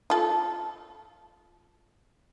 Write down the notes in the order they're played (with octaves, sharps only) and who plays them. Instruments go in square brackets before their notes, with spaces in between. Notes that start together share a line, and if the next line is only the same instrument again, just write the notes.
[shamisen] F4 A4